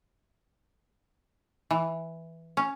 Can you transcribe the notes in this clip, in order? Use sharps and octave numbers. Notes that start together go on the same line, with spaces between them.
E3
C#4